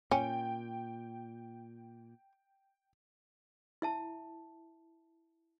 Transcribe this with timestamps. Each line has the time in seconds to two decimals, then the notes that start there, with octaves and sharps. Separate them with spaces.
0.11 A#2 C#4 G5
3.82 E4 E5 A5